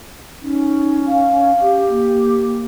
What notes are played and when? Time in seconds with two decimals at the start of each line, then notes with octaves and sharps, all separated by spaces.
0.42 C#4 D#4
1.06 F5
1.61 G4
1.88 A#3